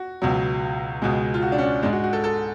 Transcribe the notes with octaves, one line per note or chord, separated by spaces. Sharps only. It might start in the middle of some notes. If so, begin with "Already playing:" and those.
Already playing: F#4
C#2 B2 F#3
C#2 B2 G#3
F4
F#4
D4
C#4
D4
G#2 G#3 D4
F#4
F#4
A4
A4